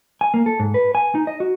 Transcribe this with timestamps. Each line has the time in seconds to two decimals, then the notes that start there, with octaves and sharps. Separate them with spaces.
0.21 G#5
0.34 A#3
0.46 A4
0.60 G#2
0.74 B4
0.95 G#5
1.15 D#4
1.27 D#5
1.40 F#4